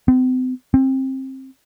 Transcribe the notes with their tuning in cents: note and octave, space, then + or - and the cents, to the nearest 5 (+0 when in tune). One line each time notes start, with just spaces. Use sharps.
C4 -40
C4 +25